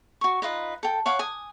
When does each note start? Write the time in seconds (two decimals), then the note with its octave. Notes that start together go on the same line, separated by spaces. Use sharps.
0.21 F#4 C#6
0.42 D#4 F4 B4 D#5
0.83 A4 G5
1.06 C#5 F5 F#5 D6
1.19 G#5 D#6